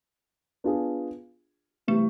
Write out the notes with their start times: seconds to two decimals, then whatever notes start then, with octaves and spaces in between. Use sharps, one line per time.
0.64 B3 D4 F4 G#4
1.88 C3 E3 G3 A3